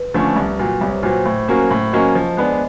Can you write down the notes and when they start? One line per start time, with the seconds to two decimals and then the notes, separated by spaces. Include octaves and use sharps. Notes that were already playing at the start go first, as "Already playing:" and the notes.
Already playing: B4
0.14 D3 F3 A3 C#4
0.36 C2
0.59 A#2 F#3
0.81 C2 C#5
0.90 C5
0.98 B4
1.03 A#2 F#3 C5
1.26 A2
1.48 F#3 A#3 C#4
1.71 A2
1.93 F#3 A#3 C#4 D#5
2.15 F3
2.37 G#3 B3 D4